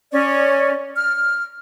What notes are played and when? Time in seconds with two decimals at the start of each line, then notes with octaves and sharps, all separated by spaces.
0.12 C#4 D5
0.96 F6